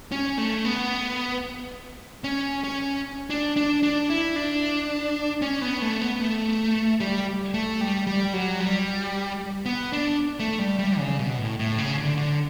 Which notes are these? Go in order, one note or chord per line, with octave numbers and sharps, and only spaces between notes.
C#4
A3
B3
C#4
C#4
D4
D4
D4
E4
D4
C#4
B3
A3
B3
A3
G3
A3
G3
G3
F#3
G3
B3
D4
A3
G3
G3
C#3
B2
A2
A2
C#3
D3
D3